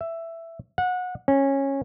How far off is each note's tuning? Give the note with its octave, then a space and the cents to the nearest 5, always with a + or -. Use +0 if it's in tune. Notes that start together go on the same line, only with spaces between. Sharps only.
E5 +10
F#5 -25
C#4 -15